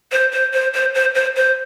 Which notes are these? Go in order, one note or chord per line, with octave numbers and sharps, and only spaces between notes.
C5
C5
C5
C5
C5
C5
C5